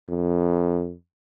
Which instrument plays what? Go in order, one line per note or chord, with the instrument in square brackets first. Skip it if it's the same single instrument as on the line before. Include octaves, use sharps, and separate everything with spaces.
[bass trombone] F2